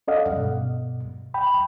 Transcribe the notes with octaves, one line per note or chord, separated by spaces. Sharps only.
C#4 A4 D5 D#5 F5 F#5
G2 B2
G5 B5